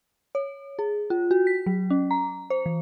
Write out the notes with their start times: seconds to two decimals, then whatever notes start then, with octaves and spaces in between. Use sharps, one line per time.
0.35 C#5
0.79 G#4
1.10 F4
1.31 F#4
1.47 B6
1.66 F#3
1.90 C#4
2.11 A#5
2.50 C5
2.66 E3